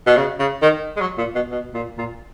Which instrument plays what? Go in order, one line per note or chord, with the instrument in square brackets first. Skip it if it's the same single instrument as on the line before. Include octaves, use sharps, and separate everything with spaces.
[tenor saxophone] B2
C#3
C#3
D#3
G#3
F#3
A#2
B2
B2
A#2
A#2